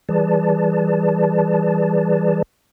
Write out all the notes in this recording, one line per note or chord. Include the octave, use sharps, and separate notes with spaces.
E3 G3 G#4 B4 D5 A5